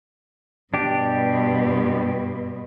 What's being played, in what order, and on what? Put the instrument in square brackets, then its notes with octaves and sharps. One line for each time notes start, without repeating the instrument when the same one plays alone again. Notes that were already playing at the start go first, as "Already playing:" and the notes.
[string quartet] G2 B2 [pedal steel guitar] D4 G4